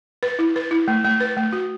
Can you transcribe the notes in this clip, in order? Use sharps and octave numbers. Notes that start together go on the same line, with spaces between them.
B4
E4
B4
E4
A3
A3
B4
A3
F#4